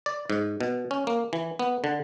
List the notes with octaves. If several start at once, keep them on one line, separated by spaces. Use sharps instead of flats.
D5
G#2
B2
C#4
A#3
E3
B3
D3